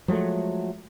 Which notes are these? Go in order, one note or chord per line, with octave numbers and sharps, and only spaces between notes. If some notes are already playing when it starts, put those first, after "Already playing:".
F3 F#3 G#3 A3